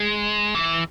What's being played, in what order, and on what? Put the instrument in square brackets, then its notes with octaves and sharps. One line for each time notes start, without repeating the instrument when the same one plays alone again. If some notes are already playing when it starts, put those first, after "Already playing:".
Already playing: [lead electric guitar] G#3
E3